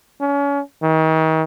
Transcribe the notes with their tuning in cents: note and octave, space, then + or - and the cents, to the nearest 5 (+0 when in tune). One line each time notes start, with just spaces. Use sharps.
C#4 +35
D#3 +35